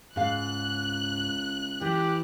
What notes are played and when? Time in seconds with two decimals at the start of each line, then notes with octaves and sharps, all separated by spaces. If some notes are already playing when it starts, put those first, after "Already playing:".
0.16 C#2 G#2 F5 F#6
1.81 E3 G4